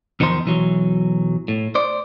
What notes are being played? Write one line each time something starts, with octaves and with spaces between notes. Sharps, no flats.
E2 D#3 F3 D#4 C5
B1 E3 F#3
A2
C5 D5